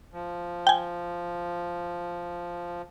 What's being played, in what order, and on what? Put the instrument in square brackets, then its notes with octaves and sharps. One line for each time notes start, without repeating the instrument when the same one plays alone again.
[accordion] F3
[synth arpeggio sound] G5 G#5